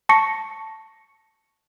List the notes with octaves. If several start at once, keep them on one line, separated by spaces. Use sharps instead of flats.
A5 C#6 A#6 C#7